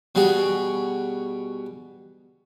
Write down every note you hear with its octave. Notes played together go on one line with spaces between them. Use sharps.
B2 G3 F#4 G#4